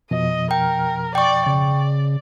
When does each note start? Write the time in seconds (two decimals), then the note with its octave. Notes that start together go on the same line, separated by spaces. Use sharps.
0.11 F2 B2 F3 D#5
0.51 A#4 G5
1.15 D5 G5 C#6
1.46 C#3 D5